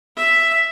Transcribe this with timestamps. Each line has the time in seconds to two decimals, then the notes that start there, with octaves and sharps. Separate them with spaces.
0.17 E5